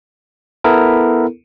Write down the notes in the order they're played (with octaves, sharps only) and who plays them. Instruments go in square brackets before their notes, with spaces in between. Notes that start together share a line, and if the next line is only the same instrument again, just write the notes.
[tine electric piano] B3 E4 A4 A#4